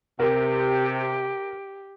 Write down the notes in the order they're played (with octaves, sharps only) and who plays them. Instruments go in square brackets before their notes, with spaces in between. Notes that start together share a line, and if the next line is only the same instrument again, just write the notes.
[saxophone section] C3 [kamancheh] G4 [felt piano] A#4